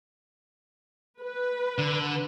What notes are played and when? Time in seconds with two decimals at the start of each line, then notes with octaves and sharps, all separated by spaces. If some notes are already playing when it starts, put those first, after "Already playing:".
1.22 B4
1.78 D3